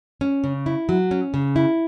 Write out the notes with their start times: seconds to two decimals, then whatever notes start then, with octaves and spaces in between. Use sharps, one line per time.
0.21 C#4
0.44 C#3
0.66 E4
0.89 F#3
1.11 C#4
1.34 C#3
1.56 E4